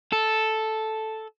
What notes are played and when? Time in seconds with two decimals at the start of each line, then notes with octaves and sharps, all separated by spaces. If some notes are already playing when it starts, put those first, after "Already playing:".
0.12 A4